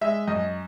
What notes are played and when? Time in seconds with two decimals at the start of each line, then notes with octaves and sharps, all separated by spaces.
0.01 G#3 E5
0.27 F#2 D#5